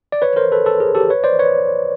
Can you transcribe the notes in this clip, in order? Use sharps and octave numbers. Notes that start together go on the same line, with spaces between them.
D5
B4 C#5
A#4 C5
A4 B4
A4 B4
G#4 A#4
G4 A4
B4 C#5
C5 D5
B4 C#5